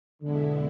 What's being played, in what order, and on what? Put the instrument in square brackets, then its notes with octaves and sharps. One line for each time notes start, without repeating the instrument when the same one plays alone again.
[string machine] E2 B2 G#3 B3 E4 [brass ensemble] D3